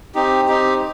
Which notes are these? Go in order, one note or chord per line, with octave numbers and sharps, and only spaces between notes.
C4 D#4 G4
C4 D#4 G4